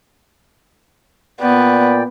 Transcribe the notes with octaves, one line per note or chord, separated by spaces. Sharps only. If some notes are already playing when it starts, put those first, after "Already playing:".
A#2 B3 D5 G5